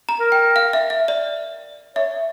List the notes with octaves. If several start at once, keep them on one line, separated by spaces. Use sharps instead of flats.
A#5
A#4
G5
F5
E5
E5
D5
C#5 E5